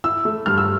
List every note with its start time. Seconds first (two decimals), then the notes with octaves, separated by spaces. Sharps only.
0.04 E4 E6
0.25 A3
0.46 G2 F6
0.58 E6